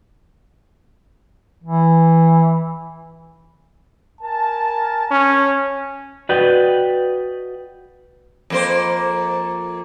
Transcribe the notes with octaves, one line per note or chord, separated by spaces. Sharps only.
E3
A#4 G#5 A5
C#4
F#4 B4 D5 D#5 G5
F2 A#3 C5